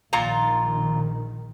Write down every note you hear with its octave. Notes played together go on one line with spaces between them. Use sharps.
A#1 A#2 D#3 F4 A#5